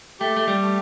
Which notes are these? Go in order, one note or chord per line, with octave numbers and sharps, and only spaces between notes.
A3 G4
A3
G3
A3